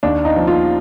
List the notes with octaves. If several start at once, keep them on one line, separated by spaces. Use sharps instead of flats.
D#2 D4
D#4
F3
F4